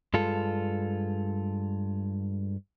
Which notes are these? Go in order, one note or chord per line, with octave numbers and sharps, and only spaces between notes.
G2 G#3 F4 A4